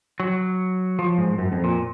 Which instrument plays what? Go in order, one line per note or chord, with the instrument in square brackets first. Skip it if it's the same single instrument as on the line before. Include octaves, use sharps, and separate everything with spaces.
[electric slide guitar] F#3
F3
G#2
F#2
F2
A#2